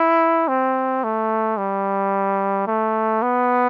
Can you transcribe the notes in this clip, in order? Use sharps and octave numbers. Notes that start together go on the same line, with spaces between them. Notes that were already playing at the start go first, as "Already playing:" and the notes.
Already playing: E4
C4
A3
G3
A3
B3